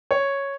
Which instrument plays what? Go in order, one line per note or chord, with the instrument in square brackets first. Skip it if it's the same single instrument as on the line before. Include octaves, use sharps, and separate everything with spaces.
[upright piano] C#5